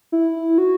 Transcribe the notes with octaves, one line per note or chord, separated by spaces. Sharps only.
E4
F#4